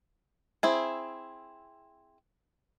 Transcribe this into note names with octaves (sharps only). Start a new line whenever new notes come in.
C4 E4 G#4